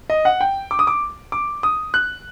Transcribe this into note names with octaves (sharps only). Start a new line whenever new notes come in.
D#5
F#5
G5
D6
D#6
D6
D6
D#6
F#6